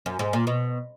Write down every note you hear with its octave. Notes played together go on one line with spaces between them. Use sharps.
F#2
G#2
A#2
B2